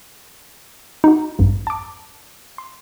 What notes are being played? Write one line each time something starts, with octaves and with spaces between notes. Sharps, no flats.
D#4 F#4
A1 E2 G2
A5 D6
C6